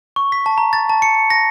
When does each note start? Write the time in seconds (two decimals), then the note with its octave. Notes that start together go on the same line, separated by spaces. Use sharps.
0.16 C#6
0.32 B6
0.46 A5
0.58 A#5
0.73 A6
0.89 A5
1.02 C#7
1.30 A#6